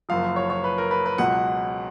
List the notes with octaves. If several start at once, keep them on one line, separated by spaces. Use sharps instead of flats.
F#1 F#2 F3 F5
C#5
C#5
B4
A#4
B4
B4
C#2 B2 F#3 F#5